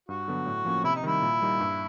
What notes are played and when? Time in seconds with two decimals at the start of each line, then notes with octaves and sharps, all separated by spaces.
0.09 G2 F#4
0.28 D3 F#3 B3
0.46 A2
0.65 F3 A#3 C#4
0.84 C3 E4
0.96 D#4
1.04 D#3 G3 E4
1.22 A#2
1.42 G3 A#3 D#4
1.60 G2